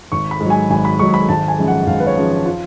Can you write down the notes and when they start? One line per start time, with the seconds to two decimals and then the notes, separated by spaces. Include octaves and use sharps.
0.12 G#1 C#6
0.31 B5
0.40 G#2
0.46 F#3 G#5
0.70 G#1 G#5
0.85 B5
0.99 G#2 F#3 C#6
1.14 B5
1.29 G#1 A5
1.48 G#5
1.58 F#2 F3 G#3
1.68 F#5
1.87 G#1 F5
2.00 B4
2.07 C#5
2.17 F#2 F3 G#3
2.46 F4